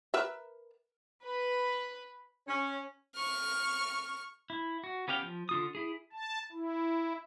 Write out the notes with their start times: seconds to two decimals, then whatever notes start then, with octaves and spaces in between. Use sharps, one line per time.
0.14 A#4 B4 E5
1.24 B4
2.48 C#4
3.16 C#6 F6
4.50 E4
4.84 F#4
5.08 B3 C#4 G4 F5 G5
5.23 F3
5.49 D3 F4 D#6
5.75 E4 G#4
6.12 A5
6.52 E4